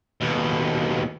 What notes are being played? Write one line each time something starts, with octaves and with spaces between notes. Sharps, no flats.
D#2 B2